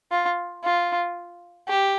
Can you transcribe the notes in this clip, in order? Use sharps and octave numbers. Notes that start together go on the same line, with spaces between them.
F4
F4
G4